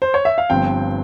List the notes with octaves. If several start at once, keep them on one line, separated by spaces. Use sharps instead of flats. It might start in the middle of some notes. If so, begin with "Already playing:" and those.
C5
C#5
E5
F5
G1 G2 F3 C4 G5